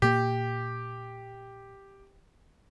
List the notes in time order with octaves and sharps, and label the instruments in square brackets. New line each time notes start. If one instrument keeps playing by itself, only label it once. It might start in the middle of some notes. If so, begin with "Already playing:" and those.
[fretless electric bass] A#2 A#3 [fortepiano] G4